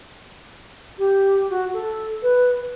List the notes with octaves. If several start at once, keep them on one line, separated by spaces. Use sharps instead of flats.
G4
F#4
A4
B4